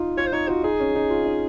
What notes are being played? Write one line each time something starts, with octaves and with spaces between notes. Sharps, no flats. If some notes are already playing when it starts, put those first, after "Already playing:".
Already playing: D#4 F4
F4 C#5
C5
D#4 C#5
F4 F#4
D#4 G#4
C#4
D#4
F4
D#4